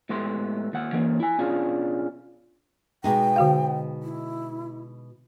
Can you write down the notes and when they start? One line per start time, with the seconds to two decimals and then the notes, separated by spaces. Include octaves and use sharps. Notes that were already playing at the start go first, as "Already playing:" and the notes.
0.09 A2 G#3 A3 B3 G4 C6
0.73 D#2 F#5
0.93 E3 A#3 C#4
1.20 E4 G#5
1.39 B2 C#4 D4 F4 G#4
3.04 B2 G#3 D#4 G5
3.36 D3 F#4 F5
4.03 E4